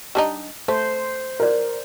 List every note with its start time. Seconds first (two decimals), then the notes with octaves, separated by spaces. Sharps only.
0.15 G3 D4 D#4
0.68 A3 C5
1.40 A#4 D5